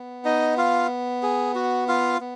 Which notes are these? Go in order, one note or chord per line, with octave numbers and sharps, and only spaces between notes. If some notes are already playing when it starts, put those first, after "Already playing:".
Already playing: B3
D#4 D#5
F4 F5
G#4
F#4
F4 F5
B3